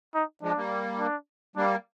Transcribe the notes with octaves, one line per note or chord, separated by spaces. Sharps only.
D#4
F3 G#3 D4
G3 A#3
D4
G3 A#3 D4